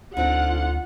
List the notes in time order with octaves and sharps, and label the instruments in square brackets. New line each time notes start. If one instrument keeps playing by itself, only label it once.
[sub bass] D2 [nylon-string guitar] D3 C4 D#4 [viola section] F4 F#5